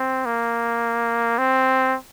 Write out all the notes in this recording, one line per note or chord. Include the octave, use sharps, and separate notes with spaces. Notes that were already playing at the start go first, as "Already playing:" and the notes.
Already playing: C4
A#3
C4